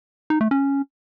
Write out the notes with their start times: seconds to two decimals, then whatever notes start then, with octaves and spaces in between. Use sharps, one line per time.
0.30 D#4
0.41 A3
0.51 C#4